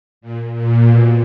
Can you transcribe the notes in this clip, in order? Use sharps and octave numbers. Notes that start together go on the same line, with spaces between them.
A#2
A#2
B2